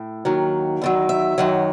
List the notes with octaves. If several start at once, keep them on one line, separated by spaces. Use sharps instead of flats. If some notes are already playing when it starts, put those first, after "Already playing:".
Already playing: A2
D#2 D#3 F#3
E2 D#3 F#3
E5
F#2 D#3 F#3